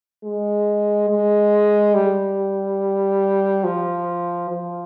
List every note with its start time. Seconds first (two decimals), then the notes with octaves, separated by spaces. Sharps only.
0.24 G#3
1.09 G#3
1.94 G3
3.64 F3
4.50 F3